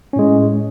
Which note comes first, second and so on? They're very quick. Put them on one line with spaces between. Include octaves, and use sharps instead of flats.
C#4 A2 G#3